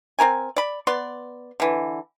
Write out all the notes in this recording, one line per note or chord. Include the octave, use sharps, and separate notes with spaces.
C4 E4 A#4 G#5
D5 B5
B3 D5 C6
D3 E3